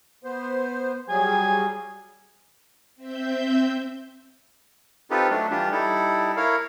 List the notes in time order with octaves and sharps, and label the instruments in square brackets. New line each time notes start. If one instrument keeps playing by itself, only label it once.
[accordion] B3 C5
[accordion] F#3 G3 G#4 [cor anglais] G#5
[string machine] C4 E5 G6
[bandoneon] C4 D#4 F4 G4 A4 B4
F#3 A3 D4
E3 G3 D4 F4 G4
G3 D#4 E4 A4
E4 A#4 C#5 F5